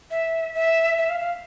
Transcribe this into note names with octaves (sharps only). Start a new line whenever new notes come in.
E5
E5
E5
F5
F5